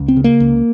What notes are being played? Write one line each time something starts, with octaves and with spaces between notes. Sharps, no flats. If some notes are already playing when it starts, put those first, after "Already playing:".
Already playing: C#2
C4
C#3
A#3
C#2